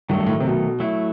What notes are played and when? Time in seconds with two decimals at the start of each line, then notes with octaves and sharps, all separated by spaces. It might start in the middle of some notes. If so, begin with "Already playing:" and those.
0.09 G2 D#3 F#3 A3
0.20 G2
0.27 A2
0.40 C3
0.45 B2
0.80 F#3 A3 E4